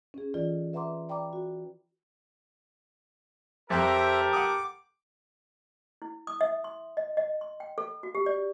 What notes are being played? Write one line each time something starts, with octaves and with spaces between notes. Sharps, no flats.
C#4 G#4
E3 F4 A4 D5 D#5
B4 E5 F#5 A#5 C6 D6
D5 G5 A#5 B5 D6
F#4
F2 G4 A4 A#4 C5 E5
F#5 D6 D#6
E4
D#6
E5
C6
D#5
D#5
C6
G5
A4
F#4
G4
D5